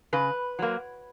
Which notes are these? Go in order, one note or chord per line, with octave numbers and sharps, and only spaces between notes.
C#3 B4
F#3 A#3